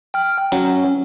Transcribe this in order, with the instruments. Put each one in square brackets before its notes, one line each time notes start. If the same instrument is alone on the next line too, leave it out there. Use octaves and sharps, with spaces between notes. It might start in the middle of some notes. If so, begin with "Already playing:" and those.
[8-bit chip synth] G5 F6
[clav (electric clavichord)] F#3 [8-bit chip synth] C#4